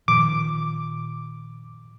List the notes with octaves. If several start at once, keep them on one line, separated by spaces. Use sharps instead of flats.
A#2 D#3 F3 D6